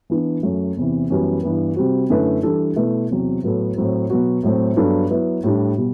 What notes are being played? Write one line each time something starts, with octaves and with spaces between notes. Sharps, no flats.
E3 B3 D4
F#2 F#3 A3
E2 C3 E3
F#2 E3 G3 B3 F#4
G2 E3 B3
C3 G3 C4 F#4
F#2 D3 A3 E4 B4
E3 G3 D4 A4
B2 A3 E4 B4
E2 C3 F#3 C4
A2 F#3 B3 F#4 A4
A2 F#3 C4
B2 F#3 B3 F#4
A2 F#3 A3 C4
G2 F#3 B3 D4 A4
F#3 B3 E4 B4
A2 G3 D4
B2 G3